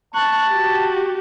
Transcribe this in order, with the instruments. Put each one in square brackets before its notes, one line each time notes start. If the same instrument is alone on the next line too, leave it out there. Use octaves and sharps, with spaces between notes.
[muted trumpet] A5 [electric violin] C#6 F#6
[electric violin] F#4 G4